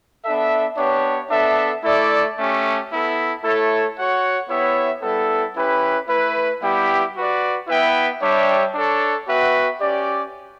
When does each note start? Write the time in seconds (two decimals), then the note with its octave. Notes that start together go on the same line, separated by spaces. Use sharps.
0.24 B3 D4 A4 E5
0.77 B3 D4 G4 C#5
1.30 B3 D4 A4 E5
1.83 A3 E4 A4 D5
2.36 A3 C#4 G4
2.90 B3 E4 A4
3.43 A3 E4 A4 C#5
3.96 F#4 C#5 F#5
4.49 B3 E4 G4 C#5 E5
5.02 G3 B3 E4 A4
5.55 C#4 E4 G4 B4
6.08 A3 E4 B4
6.62 G3 B3 E4 G4
7.15 F#4 B4 D5
7.68 B3 E4 B4 E5 G5
8.21 G3 D4 G4 C#5 E5
8.74 D4 A4 C#5
9.27 B3 F#4 B4 E5 G5
9.81 C#4 G4 D5